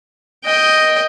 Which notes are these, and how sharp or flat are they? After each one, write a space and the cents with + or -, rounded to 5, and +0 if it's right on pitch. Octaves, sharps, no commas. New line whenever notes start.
D#5 +0 G5 +0